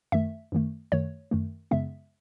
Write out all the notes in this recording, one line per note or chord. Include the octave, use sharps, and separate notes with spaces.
F#2 D#3 A3 E5
F#2 D#3 A3
F#2 D#3 A3 C#5
F#2 D#3 A3
F#2 C#3 G#3 B3 E5